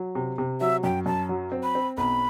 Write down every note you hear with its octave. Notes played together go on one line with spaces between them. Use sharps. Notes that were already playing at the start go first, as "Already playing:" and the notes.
Already playing: F#3
C3
C3
F#3 E5
F#2 G5
F#2 A5
F#3
C4
B5
C4
B1 B5